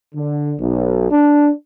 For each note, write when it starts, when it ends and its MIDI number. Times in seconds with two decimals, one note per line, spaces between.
0.15 0.53 50
0.58 1.10 35
1.11 1.50 62